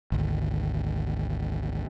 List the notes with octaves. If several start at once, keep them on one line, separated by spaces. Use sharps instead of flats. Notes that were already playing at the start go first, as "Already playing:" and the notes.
G#1 D2